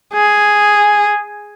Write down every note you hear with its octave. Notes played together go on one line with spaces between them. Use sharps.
G#4